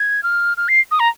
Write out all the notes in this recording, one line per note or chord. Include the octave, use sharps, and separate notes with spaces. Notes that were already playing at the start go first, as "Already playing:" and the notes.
Already playing: G#6
F6
F6
C7
D#6
A#5